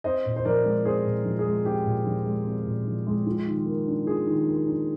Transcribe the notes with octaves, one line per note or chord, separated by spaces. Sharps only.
C4 C5 D#5
A#2
C5
F3 A#4 D5
G#3
C4 G#4 C5
A#2
F3
G#4
G#3
C4 G4
A#2
F3
G#3
C4
A#2
F3
G#3
F4
D#3
A#3
D4
F4 G#4
D#3
A#3
D4